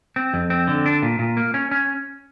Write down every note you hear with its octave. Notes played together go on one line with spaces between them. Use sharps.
C4
F2
C4
D3
D4
A#2
A#2
A#3
C#4
C#4